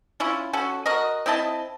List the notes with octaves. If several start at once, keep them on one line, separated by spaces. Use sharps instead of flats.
C#4 E4 F4
C#4 F#4 A4
F#4 A#4 D#5
C4 E4 D#5 A5